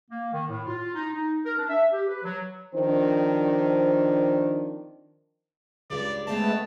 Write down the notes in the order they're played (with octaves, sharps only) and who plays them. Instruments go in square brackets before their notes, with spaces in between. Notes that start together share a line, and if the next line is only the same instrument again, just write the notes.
[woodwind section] A#3
D#3
A2
F4
D#4
D#4
A#4
D4
E5
G4
B4
F#3
[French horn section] D#3 F3 C4 D4 C5
[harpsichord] C#2 G2 [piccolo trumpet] D5
[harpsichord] C#3 C4 B5 [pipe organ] G#3 A3 B3 [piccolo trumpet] A5